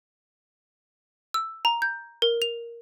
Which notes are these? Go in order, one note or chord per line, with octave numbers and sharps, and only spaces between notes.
E6
A#5
G6
A#4
F7